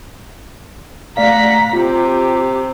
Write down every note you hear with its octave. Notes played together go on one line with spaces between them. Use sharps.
A3 D5 F5 F#5 A#5 B6
C3 F4 G4